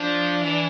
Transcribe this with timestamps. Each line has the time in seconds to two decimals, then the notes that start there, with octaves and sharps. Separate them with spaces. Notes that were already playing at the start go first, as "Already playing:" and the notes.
Already playing: F3 D4
0.41 E3